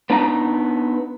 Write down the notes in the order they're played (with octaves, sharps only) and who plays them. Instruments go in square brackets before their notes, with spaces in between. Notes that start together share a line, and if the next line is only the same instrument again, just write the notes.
[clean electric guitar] B3 D4 D#4 A#5